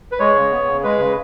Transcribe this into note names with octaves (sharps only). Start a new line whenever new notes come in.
B4
G#3 C#5
C#3
B3
C#3
G#3 B4
C#3